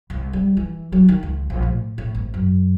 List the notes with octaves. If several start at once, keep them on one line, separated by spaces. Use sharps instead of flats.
C2
G3
E3
F#3
D#3
C#2
A#1
A2
A2
G#1
F#2